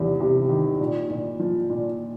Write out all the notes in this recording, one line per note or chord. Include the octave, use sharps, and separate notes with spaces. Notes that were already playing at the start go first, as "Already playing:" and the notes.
Already playing: E2 C3 D#3
C3
D#3
A#2
A#2
F3
A#2